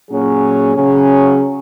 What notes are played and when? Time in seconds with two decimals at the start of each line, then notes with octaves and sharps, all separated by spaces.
0.09 A#2 F#3 C#4 G#4
0.76 C#3 F#3 C#4 G#4